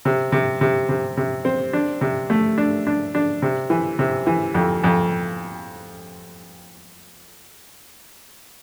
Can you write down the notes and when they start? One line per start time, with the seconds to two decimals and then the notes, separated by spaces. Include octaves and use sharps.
0.05 C3
0.32 C3
0.61 C3
0.89 C3
1.17 C3
1.45 C4
1.73 D4
2.01 C3
2.30 A3
2.58 D4
2.87 D4
3.15 D4
3.42 C3
3.70 E3
3.99 C3
4.27 E3
4.55 F2
4.84 F2